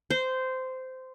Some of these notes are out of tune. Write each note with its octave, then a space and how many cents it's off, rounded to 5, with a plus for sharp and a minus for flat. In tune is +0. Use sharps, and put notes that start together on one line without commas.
C5 -15